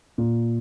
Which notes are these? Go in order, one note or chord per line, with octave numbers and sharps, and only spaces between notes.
A#2